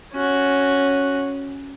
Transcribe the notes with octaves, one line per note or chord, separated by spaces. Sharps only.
C#4 F#4